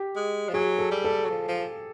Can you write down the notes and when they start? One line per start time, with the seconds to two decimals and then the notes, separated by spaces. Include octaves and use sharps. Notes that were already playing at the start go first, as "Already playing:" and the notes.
Already playing: G4
0.16 G#3
0.49 F3
0.54 F#3 G#4
0.78 A4
0.91 G3
1.04 A4
1.25 F#3
1.29 F3
1.48 F3